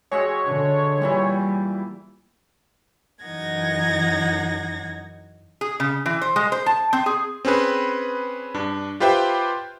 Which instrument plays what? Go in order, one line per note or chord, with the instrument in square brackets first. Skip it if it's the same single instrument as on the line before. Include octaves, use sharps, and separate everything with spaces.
[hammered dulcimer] G#3 F#4 E5 [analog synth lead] C#5
[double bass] D3
[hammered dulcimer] A#2 E3 E4 [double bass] G3
[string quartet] F#2 E3 D#4 F#5 G#6 A#6
[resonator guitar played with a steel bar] G#4
C#3
E3
C5
G#3
C5
A5
C4
G#4
[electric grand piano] C4 C#4 G#4 B4
G2 D4
F4 G4 B4 C5 E5 G5